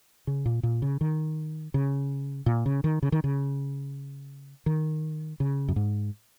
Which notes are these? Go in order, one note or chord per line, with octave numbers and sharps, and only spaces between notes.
C#3
A#2
A#2
C#3
D#3
C#3
A#2
C#3
D#3
C#3
D#3
C#3
D#3
C#3
F#2
G#2